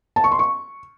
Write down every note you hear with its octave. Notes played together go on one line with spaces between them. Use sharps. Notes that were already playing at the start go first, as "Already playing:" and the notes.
A5
C#6
C6
C#6